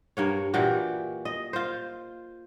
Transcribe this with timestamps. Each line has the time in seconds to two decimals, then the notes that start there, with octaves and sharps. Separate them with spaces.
0.17 G2 A#3 C#5
0.54 A#2 E3 F#4 G4
1.25 D#5
1.53 F4 C5